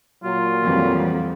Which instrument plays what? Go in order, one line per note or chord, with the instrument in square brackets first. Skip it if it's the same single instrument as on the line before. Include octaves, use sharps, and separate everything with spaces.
[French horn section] A#2 F#3 [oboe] F4
[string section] F2 [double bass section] D#3 E3 G3